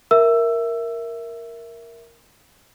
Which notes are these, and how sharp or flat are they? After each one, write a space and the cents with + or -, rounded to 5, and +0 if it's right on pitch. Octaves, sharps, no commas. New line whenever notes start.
A#4 +0 E5 +0 E6 +15